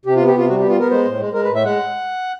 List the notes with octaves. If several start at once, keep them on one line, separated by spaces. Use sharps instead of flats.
C3 G4
F4
B3
G4
C3 F4
G3 F#4
G4
B3
F4
B3 A#4
G#3 C5
A2
G#3
G#3 A#4
B4
A2
E5
G#3 F#5